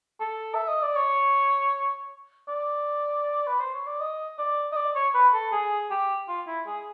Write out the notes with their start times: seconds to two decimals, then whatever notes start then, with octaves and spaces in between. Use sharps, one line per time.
0.20 A4
0.55 E5
0.68 D#5
0.82 D5
0.96 C#5
2.48 D5
3.47 B4
3.60 C5
3.74 C#5
3.87 D5
4.00 D#5
4.38 D5
4.72 D#5
4.76 D5
4.95 C#5
5.14 B4
5.34 A4
5.52 G#4
5.90 G4
6.29 F4
6.47 E4
6.66 G#4